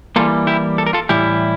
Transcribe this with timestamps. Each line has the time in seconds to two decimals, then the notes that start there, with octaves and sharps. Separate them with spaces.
0.16 E3 G3 A#3 F4 A4
0.47 E4 G4
0.78 A4
0.86 A#4
0.93 F4 A4
1.09 A2 E3 G3 E4 G4